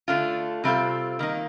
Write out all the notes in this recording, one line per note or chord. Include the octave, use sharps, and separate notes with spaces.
D3 A3 D4 F4
C3 G3 C4 F4 A4
D#3 A#3 D#4